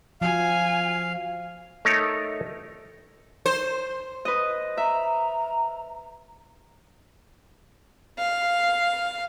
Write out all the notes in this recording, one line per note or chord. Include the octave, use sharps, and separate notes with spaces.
F3 F#4 F5 G#5
A3 D#4 A#4 C#5
C5
B4 D#5
E5 A#5
F5